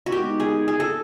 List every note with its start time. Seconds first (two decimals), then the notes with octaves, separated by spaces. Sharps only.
0.06 F#4
0.12 D#3 G#3 B3 D#4 G4
0.40 G#4
0.68 G#4
0.80 A4